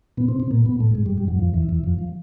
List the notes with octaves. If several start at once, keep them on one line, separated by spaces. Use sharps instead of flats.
B2 B3
C3 C4
C3 C4
A#2 A#3
B2 B3
A2 A3
G#2 G#3
G2 G3
G2 G3
F#2 F#3
F2 F3
E2 E3
E2 E3
F2 F3
F3